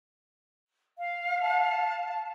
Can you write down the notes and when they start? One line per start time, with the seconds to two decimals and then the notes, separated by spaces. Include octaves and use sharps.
0.98 F5
1.42 A5